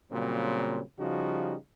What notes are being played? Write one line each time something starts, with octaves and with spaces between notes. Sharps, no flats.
A#2 C#3 F#3 G3 C4
C#3 F3 G3 D#4 F#4